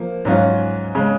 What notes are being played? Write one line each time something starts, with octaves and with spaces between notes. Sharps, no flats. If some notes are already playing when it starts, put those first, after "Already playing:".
Already playing: F3 A#3
G#2 F#3 C#4 F4
C#3 G#3